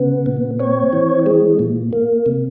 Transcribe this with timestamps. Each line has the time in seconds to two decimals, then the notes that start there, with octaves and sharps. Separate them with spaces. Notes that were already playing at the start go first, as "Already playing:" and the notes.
Already playing: C#3 B3
0.26 A#2
0.59 C4 C#5
0.93 E3
1.26 G#3
1.59 A#2
1.93 A#3
2.26 C3